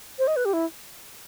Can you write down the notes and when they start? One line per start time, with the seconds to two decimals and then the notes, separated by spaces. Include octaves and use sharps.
0.19 C5
0.27 D#5
0.36 B4
0.45 G4
0.53 E4